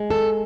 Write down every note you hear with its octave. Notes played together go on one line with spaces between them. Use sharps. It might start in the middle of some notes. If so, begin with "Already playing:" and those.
Already playing: G#3
A4